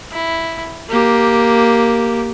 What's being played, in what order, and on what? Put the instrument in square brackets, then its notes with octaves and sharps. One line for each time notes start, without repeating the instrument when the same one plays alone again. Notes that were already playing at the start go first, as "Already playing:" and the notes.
[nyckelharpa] E4
A#3 G4